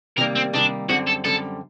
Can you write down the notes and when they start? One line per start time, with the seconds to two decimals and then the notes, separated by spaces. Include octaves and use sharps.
0.18 C3 D#3 G3 A#3 A#4
0.36 C4
0.53 C3 D#3 G3 A#3 D4
0.89 F#2 D3 G3 C4 F#4
1.07 A4
1.24 F#2 D3 G3 C4 A4